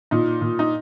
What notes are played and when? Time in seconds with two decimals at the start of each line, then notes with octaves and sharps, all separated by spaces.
0.11 A#2 D#4
0.42 A#2
0.59 D#4